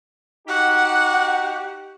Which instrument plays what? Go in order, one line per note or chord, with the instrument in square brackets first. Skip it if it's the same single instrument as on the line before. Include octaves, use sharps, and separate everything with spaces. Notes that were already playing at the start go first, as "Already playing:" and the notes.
[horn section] D#4 F#4 G4 [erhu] F#5